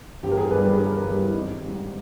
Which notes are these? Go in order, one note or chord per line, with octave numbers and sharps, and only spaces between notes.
G1 G4
A#4
G#4
G2 G3 B4
B4
G#4
G1 A#4
A#4
G2 G3 G4
E4
G#1 D#4
G3
G#2